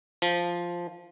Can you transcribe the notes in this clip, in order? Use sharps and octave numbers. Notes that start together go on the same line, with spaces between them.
F3